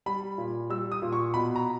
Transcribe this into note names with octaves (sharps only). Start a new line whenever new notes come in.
G3 B5
A#2
G3 E6
D#6
A#2
C#6
B2 B5
A#5